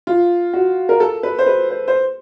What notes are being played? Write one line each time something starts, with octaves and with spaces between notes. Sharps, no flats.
F4
F#4
A#4
A4
B4
C5
B4
C5
C5